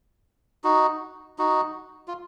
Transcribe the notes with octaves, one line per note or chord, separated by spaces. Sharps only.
D#4 F#4
D#4 F#4
F4